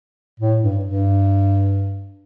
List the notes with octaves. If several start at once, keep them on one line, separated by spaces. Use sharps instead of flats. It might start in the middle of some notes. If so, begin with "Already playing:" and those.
A2
G2
G2